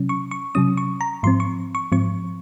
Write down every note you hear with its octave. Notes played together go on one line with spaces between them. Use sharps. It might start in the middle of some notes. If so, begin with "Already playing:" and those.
Already playing: C3 F#3 C#4
C#6
C#6
C3 F#3 C#4 D#6
C#6
A#5
G#2 F3 C4 C6
C#6
C#6
G#2 F3 C4 C#6